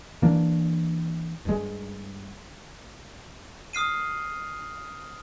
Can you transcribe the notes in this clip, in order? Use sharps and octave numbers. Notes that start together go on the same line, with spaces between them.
E3 A#3 D4
G2 G#3
D#6 F6 C7 D#7